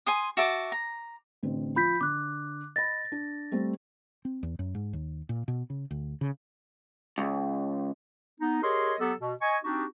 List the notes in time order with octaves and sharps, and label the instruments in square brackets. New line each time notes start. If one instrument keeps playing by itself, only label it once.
[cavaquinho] G#5 C6 D#6
F#4 E5 A5 D6
A#5
[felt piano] A1 D3 C4
[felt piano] F3 F4 [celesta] B5 G6 B6
[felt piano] D3 [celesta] D6 F#6
[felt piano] D#5 B5 [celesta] A6 A#6
[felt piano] D4
G3 A3 C4
[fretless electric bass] C4
E2
F#2
G#2
D#2
A#2
B2
C#3
D2
C#3
[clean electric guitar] C#2
[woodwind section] B3 D#4
G4 G#4 A#4 C#5 D#5 C6
F#3 B3 G4 A4
B2
D#5 G#5 C#6
C4 D4 D#4 F#4 G4